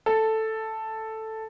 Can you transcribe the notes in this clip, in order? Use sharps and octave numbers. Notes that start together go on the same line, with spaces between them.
A4